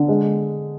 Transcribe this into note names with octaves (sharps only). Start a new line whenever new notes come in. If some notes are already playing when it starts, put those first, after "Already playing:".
Already playing: D3
G#3